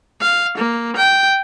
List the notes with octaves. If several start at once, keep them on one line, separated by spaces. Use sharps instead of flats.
F5
A#3
G5